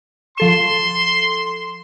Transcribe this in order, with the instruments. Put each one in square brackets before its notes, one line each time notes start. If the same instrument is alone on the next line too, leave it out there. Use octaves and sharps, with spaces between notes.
[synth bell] F3 A4 E7 [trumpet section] C6